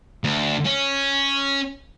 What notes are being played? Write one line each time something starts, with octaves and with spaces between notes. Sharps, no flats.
D2
C#4